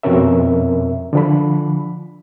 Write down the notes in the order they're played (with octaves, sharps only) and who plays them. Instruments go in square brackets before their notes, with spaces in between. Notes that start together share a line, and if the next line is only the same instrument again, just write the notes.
[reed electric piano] F2 B2 C4 C#4 A#4 E5
D3 F3 B5